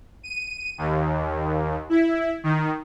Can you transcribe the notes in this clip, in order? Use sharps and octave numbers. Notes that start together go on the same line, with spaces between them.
D#7
D#2
E4
D#3